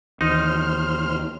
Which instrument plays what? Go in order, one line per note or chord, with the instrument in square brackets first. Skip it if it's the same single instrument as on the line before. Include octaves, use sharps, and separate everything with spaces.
[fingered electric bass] D#2 E3 [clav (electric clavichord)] D#4 [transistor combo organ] C5 F6